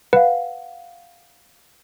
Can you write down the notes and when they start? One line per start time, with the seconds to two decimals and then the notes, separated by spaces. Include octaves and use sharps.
0.13 B4 F5 F#5